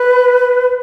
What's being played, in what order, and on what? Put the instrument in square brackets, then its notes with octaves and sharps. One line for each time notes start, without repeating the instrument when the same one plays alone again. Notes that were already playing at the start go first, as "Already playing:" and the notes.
Already playing: [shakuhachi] B4